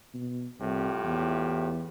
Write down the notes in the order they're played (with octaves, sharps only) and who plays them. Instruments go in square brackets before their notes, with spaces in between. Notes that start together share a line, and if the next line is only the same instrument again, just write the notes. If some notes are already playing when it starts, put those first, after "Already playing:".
[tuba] B2
[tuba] C2 [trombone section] A2 F4 G4
[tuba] E2